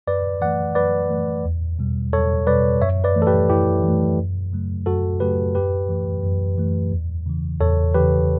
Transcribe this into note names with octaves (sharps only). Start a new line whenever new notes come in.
F#2 B4 D5
E3 A3 D5 F#5
F#2 B4 D5
E3 A3
E2
B2 G3
E2 A4 C#5
B2 G3 B4 D5
F#2 C#5 E5
B4 D5
E3 A3
A4
G4 B4
F#2 E4 G4
E3 A3
F#2
C#3 F#3 A3
F#2 F#4 A4
C#3 F#3 A3 G4 B4
F#2 G4 B4
E3 A3
F#2
E3 A3
E2
C#3 E3
E2 A4 C#5
C#3 E3 G4 B4